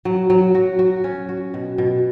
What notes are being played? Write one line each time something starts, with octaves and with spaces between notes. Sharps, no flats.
F#3
F#3
F#4
F#4
C#4
F#4
B2
B2